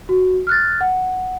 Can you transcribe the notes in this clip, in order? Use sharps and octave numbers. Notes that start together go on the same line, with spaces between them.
F#4
F6 F#6 A6
F#5